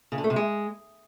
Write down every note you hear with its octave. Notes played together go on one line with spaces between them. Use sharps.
C#3
D3
A3
C3
G#3